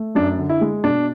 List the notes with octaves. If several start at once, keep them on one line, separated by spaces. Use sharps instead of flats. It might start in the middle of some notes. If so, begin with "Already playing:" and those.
Already playing: A3
F#2 D4
D3
E4
G#3
B2 D4